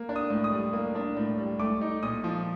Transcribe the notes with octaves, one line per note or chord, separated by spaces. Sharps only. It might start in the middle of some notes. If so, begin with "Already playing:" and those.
Already playing: A#3
D4
D#6
A2
D#6
G3
A#3
D4
A2
G3
A3 D6
D#4
A#2 D#6
F3